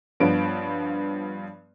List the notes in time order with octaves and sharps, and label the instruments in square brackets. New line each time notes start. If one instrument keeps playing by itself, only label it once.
[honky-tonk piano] G2 F3 B3 C#5 D7